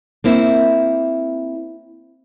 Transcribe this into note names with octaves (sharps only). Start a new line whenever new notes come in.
A#3 C4 E4